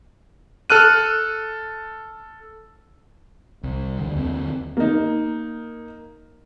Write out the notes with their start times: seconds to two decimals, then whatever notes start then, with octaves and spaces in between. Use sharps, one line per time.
0.70 A4 F6 F#6 D#7
3.63 C2
4.00 D#2 D3
4.16 D#2 D3 C4
4.77 A#3 D#4